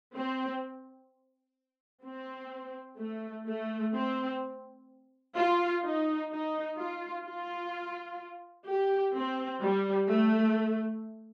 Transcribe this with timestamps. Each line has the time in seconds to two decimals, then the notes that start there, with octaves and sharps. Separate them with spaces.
0.15 C4
2.05 C4
2.99 A3
3.47 A3
3.95 C4
5.35 F4
5.83 D#4
6.31 D#4
6.78 F4
7.25 F4
8.67 G4
9.15 C4
9.62 G3
10.09 A3